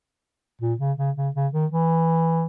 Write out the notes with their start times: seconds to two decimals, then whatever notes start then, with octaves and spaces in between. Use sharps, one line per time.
0.61 A#2
0.80 C#3
0.98 C#3
1.17 C#3
1.35 C#3
1.53 D#3
1.72 E3